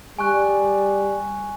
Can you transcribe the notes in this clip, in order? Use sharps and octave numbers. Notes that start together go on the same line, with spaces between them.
G3 G#5 C#6 F#6